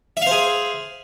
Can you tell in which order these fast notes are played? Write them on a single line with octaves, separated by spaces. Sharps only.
E5 F5 C5 G#4